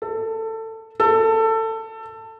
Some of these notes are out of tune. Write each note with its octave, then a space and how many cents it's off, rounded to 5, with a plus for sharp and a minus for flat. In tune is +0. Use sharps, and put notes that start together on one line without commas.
A4 +20
A4 +20